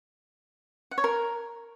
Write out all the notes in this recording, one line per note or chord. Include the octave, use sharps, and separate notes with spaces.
F#5
C#5
A#4